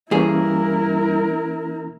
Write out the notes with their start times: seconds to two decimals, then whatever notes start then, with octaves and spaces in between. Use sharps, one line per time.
0.11 G2 E3 A#3 C#4 E4 G#4 A#4